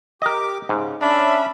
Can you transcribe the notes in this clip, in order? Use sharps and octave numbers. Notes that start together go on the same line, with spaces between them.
G4 A#4 D#5 D6
G#2 C#3
C#4 D4 E5 B5